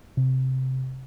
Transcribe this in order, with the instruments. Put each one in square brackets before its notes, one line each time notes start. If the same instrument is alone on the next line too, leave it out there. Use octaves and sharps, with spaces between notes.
[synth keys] C3